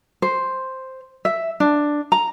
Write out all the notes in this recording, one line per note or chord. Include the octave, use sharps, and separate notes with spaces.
C5
E5
D4
A#5